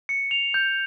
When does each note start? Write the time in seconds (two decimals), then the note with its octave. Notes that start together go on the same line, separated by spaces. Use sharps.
0.09 C#7
0.31 F7
0.54 G6